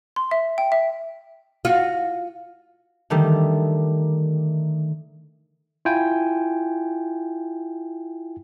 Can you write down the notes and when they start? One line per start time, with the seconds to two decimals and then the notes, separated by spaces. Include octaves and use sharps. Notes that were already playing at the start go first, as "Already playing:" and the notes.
0.16 C6
0.31 E5
0.58 G5
0.72 E5
1.65 F4 F#4
3.10 D3 D#3 G3 A3
5.85 E4 F4 G5 G#5